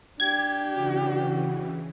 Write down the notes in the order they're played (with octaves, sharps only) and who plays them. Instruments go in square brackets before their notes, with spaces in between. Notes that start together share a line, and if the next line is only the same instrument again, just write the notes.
[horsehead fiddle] D4 G4 [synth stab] G#6
[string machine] C#3 E3 [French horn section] F#4